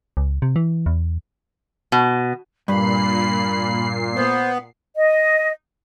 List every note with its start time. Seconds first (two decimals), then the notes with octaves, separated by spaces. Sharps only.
0.17 C#2
0.42 C3
0.56 E3
0.86 E2
1.92 B2
2.68 G2 A#2 B5 C7
4.15 B3 C5
4.96 D#5